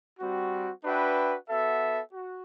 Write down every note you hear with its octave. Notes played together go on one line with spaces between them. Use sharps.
G3 C4 F#4
D4 F#4 B4 E5 G5
B3 F#4 A4 E5
F#4